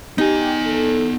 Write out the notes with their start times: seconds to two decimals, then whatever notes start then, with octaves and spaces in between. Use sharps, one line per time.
0.18 B3 D#4 G4 G#5
0.66 A4